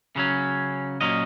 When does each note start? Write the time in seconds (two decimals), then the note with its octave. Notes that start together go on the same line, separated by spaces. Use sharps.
0.16 C#3 F#3 C#4
1.01 A#2 F#3 C#4 D#5